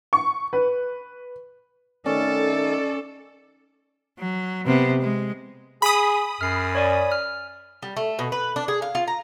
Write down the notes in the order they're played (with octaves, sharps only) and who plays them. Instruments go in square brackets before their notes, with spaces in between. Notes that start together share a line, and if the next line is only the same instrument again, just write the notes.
[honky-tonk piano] C#6
B4
[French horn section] D#3 A3 [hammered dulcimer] C#4 [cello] A4 [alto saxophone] D5
[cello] F#3
C3 B3
G#3
[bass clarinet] G#4 [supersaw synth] B5 D#6
[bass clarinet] F#2 [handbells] F6 C7
[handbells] C#5 D5 G#5
F6
[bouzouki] G3
A3
B2
B4
D4
G#4
F5
F4
A#5